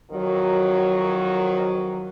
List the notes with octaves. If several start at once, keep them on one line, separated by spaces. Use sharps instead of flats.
F2 D#3 F#3